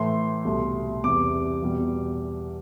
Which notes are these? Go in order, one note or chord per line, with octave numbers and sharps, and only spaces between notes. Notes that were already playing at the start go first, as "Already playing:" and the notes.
Already playing: A2 E3 A3 C6
C2 B2 A3
E2 C3 G3 D6
E2 B2 G3